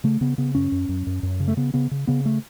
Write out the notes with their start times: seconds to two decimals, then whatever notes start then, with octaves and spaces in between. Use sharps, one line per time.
0.04 C#3 A3
0.21 C#3 B3
0.38 C#3 B3
0.55 F#2 C#4
0.72 F#2
0.89 F#2
1.07 F#2
1.23 F#2
1.40 C#3
1.48 A3
1.57 C#3 B3
1.74 C#3 B3
1.91 C#3
2.07 C#3 B3
2.25 A3